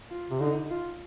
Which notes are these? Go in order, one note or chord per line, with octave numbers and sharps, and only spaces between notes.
F4
C3
D3 D#4
F4